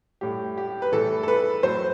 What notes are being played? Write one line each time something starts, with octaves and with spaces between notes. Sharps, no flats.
A2 G3 G4
G4
B4
A2 E3 G3 A4
A4
B4
A2 F#3 C5